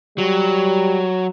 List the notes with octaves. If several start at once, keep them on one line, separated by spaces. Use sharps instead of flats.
F#3 G3